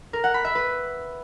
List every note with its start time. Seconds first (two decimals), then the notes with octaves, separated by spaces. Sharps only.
0.13 A#4
0.24 F#5
0.34 B5
0.45 E5
0.55 B4